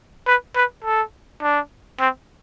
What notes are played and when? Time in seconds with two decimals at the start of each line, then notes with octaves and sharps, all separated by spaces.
0.27 B4
0.56 B4
0.85 A4
1.42 D4
2.00 C4